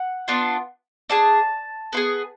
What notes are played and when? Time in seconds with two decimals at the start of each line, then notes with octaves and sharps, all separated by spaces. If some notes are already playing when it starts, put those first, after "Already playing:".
Already playing: F#5
0.28 B3 D4 F4
1.10 D4 G#4 A5
1.93 B3 F4
1.97 G#4